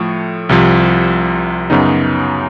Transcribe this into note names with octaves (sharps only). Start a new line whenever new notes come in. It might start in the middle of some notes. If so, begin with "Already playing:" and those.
Already playing: A2 F3 A3
C2 C3 F3
F#2 C#3 F#3 B3 D#4